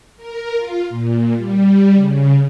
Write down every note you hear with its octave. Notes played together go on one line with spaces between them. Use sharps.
A#4
F4
A#2
G3
C#3